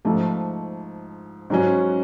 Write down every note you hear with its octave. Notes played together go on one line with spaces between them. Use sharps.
G#2 F3 A3
G#2 F#3 C#4